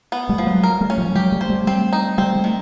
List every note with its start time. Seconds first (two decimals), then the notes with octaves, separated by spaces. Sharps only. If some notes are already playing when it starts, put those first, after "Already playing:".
0.12 B3
0.29 G3 A3
0.38 F3
0.47 F#3 G#3
0.63 A#4
0.81 G3 A3
0.90 C#4
0.98 F3 G3
1.15 F#3 G#3 G4
1.32 G3 A3
1.41 C5
1.50 G3 A3
1.67 G3 A3 C4
1.93 D#4
2.18 G3 A3 C4
2.36 G3 A3
2.44 D#3